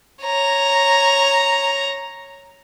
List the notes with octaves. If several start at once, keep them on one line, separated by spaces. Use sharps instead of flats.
C#5 A#5